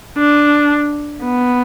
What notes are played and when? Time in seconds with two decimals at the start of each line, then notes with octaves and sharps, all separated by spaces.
0.18 D4
1.24 B3